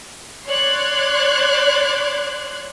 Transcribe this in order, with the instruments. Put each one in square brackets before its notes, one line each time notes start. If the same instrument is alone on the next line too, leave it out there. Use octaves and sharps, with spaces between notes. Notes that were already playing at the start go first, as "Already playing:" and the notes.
[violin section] C#5 D5 C6 F#6 G#6